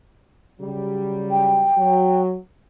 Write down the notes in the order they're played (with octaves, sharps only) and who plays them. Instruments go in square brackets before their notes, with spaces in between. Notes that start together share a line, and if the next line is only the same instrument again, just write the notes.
[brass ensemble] C#3 F#3 G3
[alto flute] G5
[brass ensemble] F#3